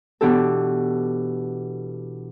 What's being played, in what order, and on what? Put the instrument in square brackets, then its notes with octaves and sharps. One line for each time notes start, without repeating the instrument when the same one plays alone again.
[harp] B2 E3 D4 G4 A4